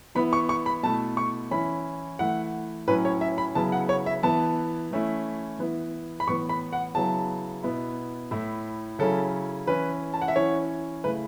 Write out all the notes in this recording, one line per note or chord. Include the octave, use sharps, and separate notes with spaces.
E3 B3 E4 B5
C#6
C#6
B5
B2 A3 E4 A5
C#6
E3 C#4 E4 B5
E3 A3 E4 F#5
A2 F#3 C#4 E4 B4
C#5
E5
B5
C#3 F#3 B3 E4 A5
F#5
C#5
E5
E3 B3 E4 A5
E3 A3 C#4 E4
E3 B3 E4
B5
A2 E3 B3 C#6
B5
F#5
C#3 F#3 B3 E4 A5
B2 B3 E4
A2 A3 E4
C#3 F#3 C#4 E4 A4
E3 C#4 E4 B4
A5
F#5
E5
E3 C#4 E4 C#5
C#3 A3 E4 B4